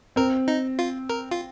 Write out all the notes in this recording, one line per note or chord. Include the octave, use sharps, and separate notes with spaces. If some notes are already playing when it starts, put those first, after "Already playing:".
C4 A#4
D#4
F4
A#4
F4